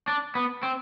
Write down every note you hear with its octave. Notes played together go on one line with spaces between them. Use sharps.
D4
B3
C4